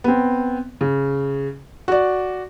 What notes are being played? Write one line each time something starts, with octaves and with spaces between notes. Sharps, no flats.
B3 C4
C#3
F#4 D5